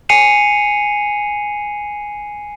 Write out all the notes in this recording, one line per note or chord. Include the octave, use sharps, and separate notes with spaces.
G#5 C7 C#7 D#7 F7